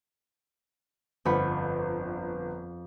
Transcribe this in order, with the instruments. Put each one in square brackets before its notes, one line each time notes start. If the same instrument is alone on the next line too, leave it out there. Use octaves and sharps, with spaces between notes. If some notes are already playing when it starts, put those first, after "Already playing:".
[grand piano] G1 [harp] F2 F#5 B5